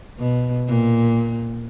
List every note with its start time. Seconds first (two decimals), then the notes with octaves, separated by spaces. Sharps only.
0.18 B2
0.67 A#2